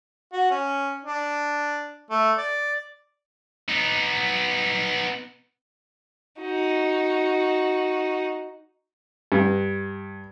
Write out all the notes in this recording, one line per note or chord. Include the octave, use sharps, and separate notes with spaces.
F#4
C#4
D4
A3
D5
B3 D#4
D#4 F#4
G2